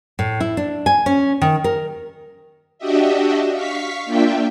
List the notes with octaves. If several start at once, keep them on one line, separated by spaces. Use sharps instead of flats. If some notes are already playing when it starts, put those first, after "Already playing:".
A2
E4
D4
G#5
C#4
D#3
A#4
D4 F#4 G4 D#5 E5
F5 C#6 B6
A#3 D4 F4 E5 G5